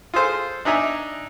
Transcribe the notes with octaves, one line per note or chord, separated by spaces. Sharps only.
F4 G#4 A4 C5
D4 D#4 E5 G#5 A#5